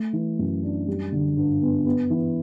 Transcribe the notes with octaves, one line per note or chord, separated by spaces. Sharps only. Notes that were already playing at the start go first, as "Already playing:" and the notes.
Already playing: A3
E3
F#2
D4
G3
D3
G2
B3
B3
E3